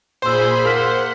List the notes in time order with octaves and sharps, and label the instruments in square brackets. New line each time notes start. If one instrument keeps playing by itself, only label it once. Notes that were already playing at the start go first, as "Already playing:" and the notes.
[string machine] A#2 G#4 B5 [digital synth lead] C5 [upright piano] C6 E6
[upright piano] A#3 F6 B6 [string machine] F#5